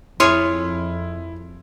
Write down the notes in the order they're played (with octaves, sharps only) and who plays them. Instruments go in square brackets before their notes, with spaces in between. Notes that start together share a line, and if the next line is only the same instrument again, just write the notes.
[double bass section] F2 [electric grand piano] E4 [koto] F4 G#4 C#5 [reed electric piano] C6